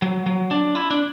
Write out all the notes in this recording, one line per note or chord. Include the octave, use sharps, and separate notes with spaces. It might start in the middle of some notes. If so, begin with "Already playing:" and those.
F#3
F#3
D4
E4
D4